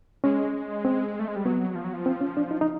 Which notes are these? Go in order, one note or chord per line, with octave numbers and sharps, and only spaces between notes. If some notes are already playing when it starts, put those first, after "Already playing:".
G#3 C#4
C4
A3
G#3
G3
F#3 B3
F3
F#3
F3
C4
C#4
D4
D#4
D#4